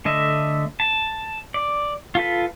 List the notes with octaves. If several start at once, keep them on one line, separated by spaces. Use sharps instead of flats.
D3 A3 D#5 E5
A5
D5
F4 A4 B4